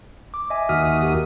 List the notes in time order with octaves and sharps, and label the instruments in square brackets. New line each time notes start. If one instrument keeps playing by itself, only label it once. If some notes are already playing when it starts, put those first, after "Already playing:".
[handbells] D6
D#5 E5 G#5
[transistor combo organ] D#2 F#4 D#6 [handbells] F6 B6
[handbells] G4 A#4